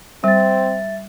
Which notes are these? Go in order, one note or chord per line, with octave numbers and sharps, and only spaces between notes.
G3 C4 E5 A6